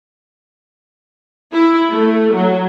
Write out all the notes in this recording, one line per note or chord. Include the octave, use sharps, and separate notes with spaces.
E4
A3
F#3